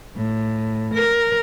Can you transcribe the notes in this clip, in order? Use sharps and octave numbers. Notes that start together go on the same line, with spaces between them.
A2
A#4